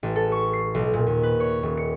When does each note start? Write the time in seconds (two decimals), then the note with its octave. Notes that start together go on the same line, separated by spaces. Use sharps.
0.03 A1
0.16 A4
0.32 C#6
0.53 C7
0.75 B1
0.93 A#2
1.07 D#2
1.23 B4
1.40 C#5
1.63 D#1
1.77 C#7